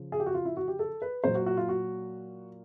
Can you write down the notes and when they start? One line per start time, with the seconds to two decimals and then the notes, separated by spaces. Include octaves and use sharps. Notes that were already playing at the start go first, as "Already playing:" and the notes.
Already playing: C#3 F3
0.12 G#4
0.20 G4
0.26 F#4
0.34 F4
0.45 E4
0.57 F#4
0.68 G4
0.79 A4
1.02 B4
1.24 A#2 F#3 C5
1.35 F#4
1.46 F#4
1.57 F4
1.69 F#4